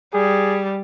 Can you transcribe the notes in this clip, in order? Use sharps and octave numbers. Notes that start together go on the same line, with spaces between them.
G3 G#4